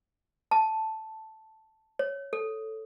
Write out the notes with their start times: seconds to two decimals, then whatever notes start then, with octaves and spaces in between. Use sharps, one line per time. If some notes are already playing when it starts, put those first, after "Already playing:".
0.51 A5
1.99 C#5
2.33 A4